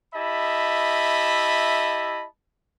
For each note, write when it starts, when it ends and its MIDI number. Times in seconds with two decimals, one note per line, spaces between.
0.14 2.25 64
0.14 2.25 67
0.14 2.25 75
0.14 2.25 76
0.14 2.25 81
0.14 2.25 83